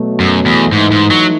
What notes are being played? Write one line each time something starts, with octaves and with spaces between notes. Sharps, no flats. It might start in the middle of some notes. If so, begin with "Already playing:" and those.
Already playing: B2 F#3 A3
F#2
E2
G#2 E3 A3 D#4
G#2
F#3